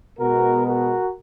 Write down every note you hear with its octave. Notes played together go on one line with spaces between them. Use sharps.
B2 G#3 B3 F#4 A#4
F#4 A#4